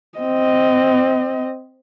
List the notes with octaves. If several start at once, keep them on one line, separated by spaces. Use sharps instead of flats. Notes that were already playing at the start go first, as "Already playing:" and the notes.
C4 D#5